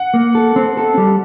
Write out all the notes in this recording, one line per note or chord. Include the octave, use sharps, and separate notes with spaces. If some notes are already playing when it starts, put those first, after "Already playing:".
Already playing: F#5
A#3
A4
C4
A4
G3